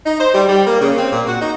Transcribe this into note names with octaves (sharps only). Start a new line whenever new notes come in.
D#4
C5
G3
G3
A#3
C#3
C4
A#2
F#4
D#4